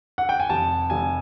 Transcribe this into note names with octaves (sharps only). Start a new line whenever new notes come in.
F#5
G5
G#5
F1 A5
F1 G#5